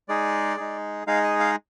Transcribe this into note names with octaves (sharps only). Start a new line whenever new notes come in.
G#3 D#4 G#4 D5
G#3 D#4 G#4
G#3 D#4 G#4 F5
D#5
F5